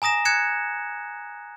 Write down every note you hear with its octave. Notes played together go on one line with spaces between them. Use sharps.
G#5 A#5 D#6 A#6 E7
F#6 G#6 C#7 E7